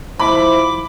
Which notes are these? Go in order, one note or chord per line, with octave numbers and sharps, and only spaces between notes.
F3 E4 C5 B5 D6